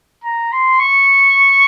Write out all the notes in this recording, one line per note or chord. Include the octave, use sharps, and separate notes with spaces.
A#5
C6
C#6